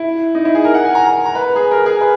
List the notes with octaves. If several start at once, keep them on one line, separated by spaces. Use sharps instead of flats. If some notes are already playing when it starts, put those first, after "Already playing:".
Already playing: E4
D#4
E4
G#4
A#4
F#5
G#5
A#5
A#5
B4
G#4
A#4
G#4
B4